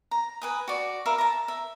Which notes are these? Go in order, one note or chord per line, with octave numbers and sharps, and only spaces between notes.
A#5
B4 G#5 D#6
F#4 D5
A#4 E5 F5 B5
A5 A#5
E5